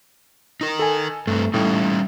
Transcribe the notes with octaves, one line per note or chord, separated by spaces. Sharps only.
D#4 A#4
A4 G#5
G2 A3 C4
A2 G3 C#4 D#4